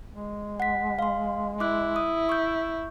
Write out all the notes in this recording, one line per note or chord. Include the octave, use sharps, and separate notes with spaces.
G#3
F#5 B6
F5 C6
E4 D6 F#6
D#6
C#6 G6